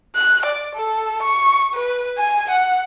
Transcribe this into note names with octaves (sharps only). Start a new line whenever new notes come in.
F#6
D5
A4
C#6
B4
G#5
F#5